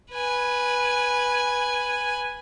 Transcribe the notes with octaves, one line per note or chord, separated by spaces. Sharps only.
B4 G#5